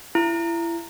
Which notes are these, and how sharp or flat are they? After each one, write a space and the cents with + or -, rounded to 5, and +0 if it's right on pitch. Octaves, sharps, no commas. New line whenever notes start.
E4 +30